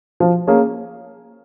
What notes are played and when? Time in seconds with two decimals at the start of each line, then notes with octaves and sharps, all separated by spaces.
0.20 F3
0.47 A#3 C#4 G#4